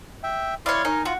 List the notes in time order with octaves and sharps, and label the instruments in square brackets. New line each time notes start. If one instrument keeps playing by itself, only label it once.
[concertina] E5 G5
[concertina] E4 D5 C6 [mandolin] C#5 F5
[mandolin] D#4 [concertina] A#4 G#5
[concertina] F4 [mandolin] F#4